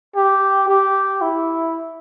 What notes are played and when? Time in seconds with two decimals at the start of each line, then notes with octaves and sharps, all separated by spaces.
0.16 G4
0.68 G4
1.21 E4